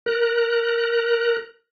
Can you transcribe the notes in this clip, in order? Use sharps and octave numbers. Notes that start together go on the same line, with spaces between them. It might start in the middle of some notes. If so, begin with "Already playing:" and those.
A#4 F#6